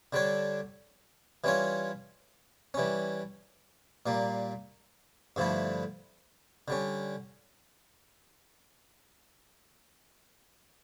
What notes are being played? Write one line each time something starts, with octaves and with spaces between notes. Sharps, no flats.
D3 G3 D4 A4 C#5
E3 G3 C#4 F4 C#5
E3 G3 C#4
A#2 G3 A#3
G2 D3 F3 A3 E4
D3 G3 C#4